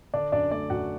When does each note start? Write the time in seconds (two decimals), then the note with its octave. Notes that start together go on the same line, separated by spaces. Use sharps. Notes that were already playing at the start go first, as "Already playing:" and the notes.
0.14 D3 D4 D5
0.32 F#2 D4 D5
0.51 A3 D4 D5
0.70 F#2 F#4 F#5